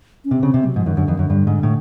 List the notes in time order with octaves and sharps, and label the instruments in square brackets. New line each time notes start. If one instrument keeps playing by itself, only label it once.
[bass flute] C#4
[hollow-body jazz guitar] C3 [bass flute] C4
[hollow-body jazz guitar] C#3
C3
[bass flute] F#3
[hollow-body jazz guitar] G#2 [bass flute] F3
[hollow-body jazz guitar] F#2 [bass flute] D#3
[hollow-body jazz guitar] F#2 [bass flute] D3
[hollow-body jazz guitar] F2 [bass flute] D#3
[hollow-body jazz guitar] F#2 [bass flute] D3
[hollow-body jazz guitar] G2
G#2
A2